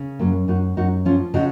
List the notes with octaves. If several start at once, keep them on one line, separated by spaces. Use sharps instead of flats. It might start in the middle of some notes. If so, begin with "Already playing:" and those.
Already playing: C#3
F#2 F#3 A#3
F#2 D#4 F#4
F#2 D#4 F#4
F3 C#4 F4
C#3 D#4 F#4